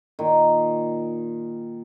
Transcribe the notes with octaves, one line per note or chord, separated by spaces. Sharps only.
A#2 D#3